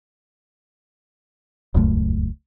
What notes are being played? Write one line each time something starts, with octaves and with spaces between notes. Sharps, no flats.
D#1 C#2 F#2 A3